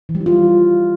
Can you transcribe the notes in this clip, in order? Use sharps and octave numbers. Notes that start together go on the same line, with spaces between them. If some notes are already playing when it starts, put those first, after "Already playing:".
E3
G3
E4
F4